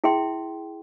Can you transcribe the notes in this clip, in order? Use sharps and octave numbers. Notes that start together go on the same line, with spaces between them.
E4 G#4 E5 G5 C6